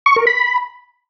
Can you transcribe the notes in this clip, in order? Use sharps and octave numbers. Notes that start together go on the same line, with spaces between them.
C#6
A#4
B5